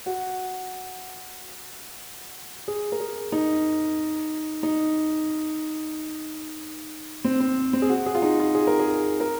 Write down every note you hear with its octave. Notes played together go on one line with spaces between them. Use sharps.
F#4
G#4
A#4
G#4
D#4
D#4
C4
C4
C4
G#4
F#4
G#4
F4
D#4
F4
G#4
A#4
G#4
A#4